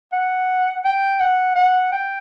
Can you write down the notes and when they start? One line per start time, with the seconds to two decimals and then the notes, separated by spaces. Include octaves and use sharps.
0.13 F#5
0.85 G5
1.20 F#5
1.56 F#5
1.92 G5